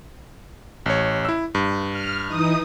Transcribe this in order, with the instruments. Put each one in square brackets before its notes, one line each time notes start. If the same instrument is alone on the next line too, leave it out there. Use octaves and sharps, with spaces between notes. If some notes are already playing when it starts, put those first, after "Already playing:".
[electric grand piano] A1 C#5
E4 E6
G2
[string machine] F6
E3 D#4 D#6